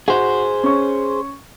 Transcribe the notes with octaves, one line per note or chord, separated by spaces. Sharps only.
F#4 G#4 C5
C#4 C#6